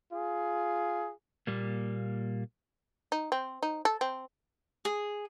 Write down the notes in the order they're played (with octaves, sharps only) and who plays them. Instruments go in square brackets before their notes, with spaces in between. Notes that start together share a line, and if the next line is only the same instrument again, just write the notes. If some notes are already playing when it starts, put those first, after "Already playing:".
[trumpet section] F4 G#4
[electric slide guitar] A#2 G3 A#3
[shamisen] D#4
C4
D#4
A4
C4
[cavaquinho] G#4